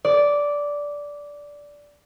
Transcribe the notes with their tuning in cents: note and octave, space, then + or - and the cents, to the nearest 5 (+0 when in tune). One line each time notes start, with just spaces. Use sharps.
D5 -10